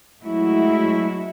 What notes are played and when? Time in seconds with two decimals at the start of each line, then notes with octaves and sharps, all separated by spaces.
0.22 F#3 G#3 A3 E4 F#4